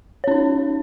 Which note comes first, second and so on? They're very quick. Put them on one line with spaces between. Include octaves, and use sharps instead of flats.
C#5 C#4 D#4